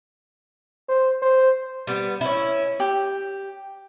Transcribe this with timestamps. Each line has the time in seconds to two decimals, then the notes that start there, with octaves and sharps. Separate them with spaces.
0.89 C5
1.22 C5
1.87 G3 B3
2.21 C#4 E4
2.80 G4